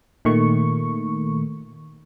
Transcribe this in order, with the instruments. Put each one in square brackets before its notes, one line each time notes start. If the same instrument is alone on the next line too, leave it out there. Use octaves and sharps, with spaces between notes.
[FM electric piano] A#2 D#3 A3 C#6